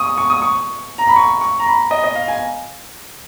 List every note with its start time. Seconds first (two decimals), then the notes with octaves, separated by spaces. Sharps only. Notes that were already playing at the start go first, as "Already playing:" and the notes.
Already playing: C#6 D#6
0.18 C#6
0.30 D#6
0.42 C#6
0.98 A#5
1.07 B5
1.16 C#6
1.41 C#6
1.59 A#5
1.67 B5
1.91 D#5
2.04 D#5
2.15 F5
2.28 G#5